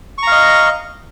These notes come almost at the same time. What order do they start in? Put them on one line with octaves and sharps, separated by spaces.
C#6 A#5 F5 D#5